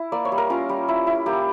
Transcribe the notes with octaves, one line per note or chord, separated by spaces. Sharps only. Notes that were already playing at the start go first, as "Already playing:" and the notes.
Already playing: E4
A#3 D5
C#5
G3
A#4
C#4 F4
G3
E4
E4
A#3 G4